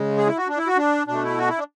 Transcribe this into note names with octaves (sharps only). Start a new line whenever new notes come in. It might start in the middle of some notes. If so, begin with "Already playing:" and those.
Already playing: C#3 G#3
G#4
E4
F#4
D4
E4
F#4
D4
B2 A3 D4
E4
F#4
E4
D4